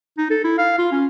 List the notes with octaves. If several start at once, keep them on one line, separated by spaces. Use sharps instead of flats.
D#4
A4
E4
F5
F4
C#4